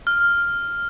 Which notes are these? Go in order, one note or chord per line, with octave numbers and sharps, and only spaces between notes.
F6